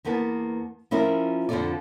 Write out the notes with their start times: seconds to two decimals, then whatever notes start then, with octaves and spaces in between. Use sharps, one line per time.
0.05 E2 A#3 B3 B4 A5
0.91 F3 C#4 E4 F4 A#4
1.49 F2 D3 C4 F4 A4 D5